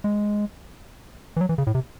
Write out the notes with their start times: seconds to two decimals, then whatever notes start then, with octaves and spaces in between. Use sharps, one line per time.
0.04 G#3
1.37 E3
1.41 F#3
1.49 E3
1.58 C#3
1.67 A2
1.75 C3